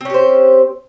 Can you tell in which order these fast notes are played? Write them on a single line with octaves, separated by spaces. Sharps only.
C4 C#4 G4 C5